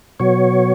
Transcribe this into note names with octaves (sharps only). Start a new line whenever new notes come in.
B2 F#3 C#5